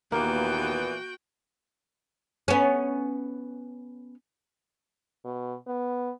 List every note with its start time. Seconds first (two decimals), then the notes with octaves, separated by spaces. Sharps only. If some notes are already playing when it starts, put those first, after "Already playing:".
0.12 D#2 A#2 E3 A#3 B3 F#4 G5
2.48 B3 C#4
5.25 B2
5.67 B3